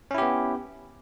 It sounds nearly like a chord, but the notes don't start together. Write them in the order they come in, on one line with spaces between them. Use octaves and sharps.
C#4 E4 G4 B3